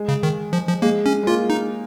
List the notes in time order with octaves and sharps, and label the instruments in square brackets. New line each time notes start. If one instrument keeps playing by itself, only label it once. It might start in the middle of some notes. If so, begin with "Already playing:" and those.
Already playing: [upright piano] G#3
[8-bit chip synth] C#3
D#3
F3
F3
[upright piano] G#3 [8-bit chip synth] A#3
[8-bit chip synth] C#4
[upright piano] G#3
[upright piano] A#3 [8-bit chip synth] F4
[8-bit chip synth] D#4